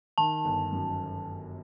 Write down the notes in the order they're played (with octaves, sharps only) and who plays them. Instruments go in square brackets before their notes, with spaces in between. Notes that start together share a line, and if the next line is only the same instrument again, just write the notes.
[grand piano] D#3 [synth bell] A5
[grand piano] G1
F#2